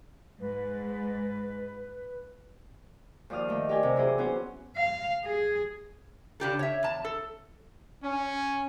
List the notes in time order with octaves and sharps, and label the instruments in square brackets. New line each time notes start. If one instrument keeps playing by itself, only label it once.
[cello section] G#2 [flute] B4
[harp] D#2 F3 D5 D#6 F6
D#3 A3
G4 A#4 D5 G5 G#5
C3
E3 F#3 E4 G#4 C5
B3 C#4 F#4 C5
[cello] F5
G#4
[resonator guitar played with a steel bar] C#3 D4 G4 A4
C#5 E5
E2 A5
A4
[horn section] C#4